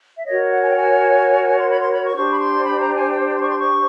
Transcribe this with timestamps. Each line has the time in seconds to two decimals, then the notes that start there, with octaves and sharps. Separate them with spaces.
0.15 E5
0.25 F#4 A#4 C#5 D#5
0.50 F#5
0.62 G#5
0.70 G5
0.76 G#5
1.58 C6
1.69 B5
1.80 C6
1.92 B5
2.05 C#6
2.16 D4 G4 C5 C#6
2.31 B5
2.39 C6
2.63 B5
2.79 A#5
2.95 G#5
3.11 G5
3.34 C6
3.42 C#6
3.49 C6
3.59 C#6